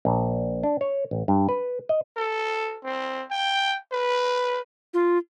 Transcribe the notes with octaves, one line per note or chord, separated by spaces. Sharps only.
A#1
D4
C#5
A1
G2
B4
D#5
A4
C4
G5
B4
F4